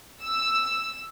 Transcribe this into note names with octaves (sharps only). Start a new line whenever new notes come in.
E6